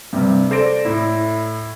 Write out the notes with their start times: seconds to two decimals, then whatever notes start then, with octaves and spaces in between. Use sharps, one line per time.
0.13 G2 C3 G3
0.50 A4 C5 D5 A#6 D7
0.85 A2 E4